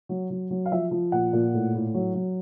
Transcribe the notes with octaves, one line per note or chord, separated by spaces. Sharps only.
F#3
F#3
F#3
F5
F3 E5
F3
A#2 F#5
A#2
A2
A2
F#3
F#3